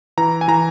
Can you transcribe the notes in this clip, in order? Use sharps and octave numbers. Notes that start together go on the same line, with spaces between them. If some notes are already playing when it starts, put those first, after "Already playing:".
E3 A#5
G#5
E3 A#5